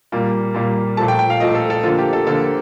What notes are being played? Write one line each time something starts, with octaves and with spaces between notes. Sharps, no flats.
A#2 G3 A#3
A#2 G3 A#3
A#2 F3 A3 A5
G5
G5
F5
A#2 F3 A3 D#5
A4
A4
D3 F3 A#3 F4
G4
A4
D3 F3 A#3 A4